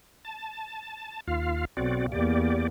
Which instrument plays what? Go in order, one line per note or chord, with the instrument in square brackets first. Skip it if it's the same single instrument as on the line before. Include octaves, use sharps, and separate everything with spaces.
[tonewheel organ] A5
D#2 F4 F5
[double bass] B1 [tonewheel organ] C4 F#4 D5
[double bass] E2 A#3 [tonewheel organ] G4 D5